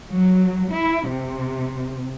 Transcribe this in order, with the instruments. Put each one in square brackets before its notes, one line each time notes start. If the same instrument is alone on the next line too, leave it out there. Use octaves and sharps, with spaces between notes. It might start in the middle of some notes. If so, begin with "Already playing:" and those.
[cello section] F#3
E4
C3